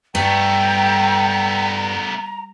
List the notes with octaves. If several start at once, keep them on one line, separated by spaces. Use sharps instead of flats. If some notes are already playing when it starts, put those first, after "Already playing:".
G2 A3 B3 G5 A#5